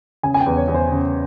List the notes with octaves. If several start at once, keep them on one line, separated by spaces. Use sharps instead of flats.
C#3 G#5
G#5
G5
E2
C#5
E2
C5
C#3